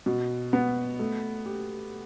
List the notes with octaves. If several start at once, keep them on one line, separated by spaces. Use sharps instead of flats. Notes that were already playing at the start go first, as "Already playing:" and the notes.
B2
B3
A3
G4